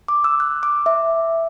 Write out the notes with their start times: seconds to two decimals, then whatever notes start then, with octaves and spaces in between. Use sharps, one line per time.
0.08 D6
0.24 E6
0.40 F#6
0.63 D6
0.86 E5